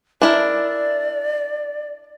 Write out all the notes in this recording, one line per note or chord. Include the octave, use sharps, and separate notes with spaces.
D4 E4 A#4 D5